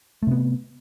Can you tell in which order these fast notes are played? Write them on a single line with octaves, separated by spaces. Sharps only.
A3 C3 B3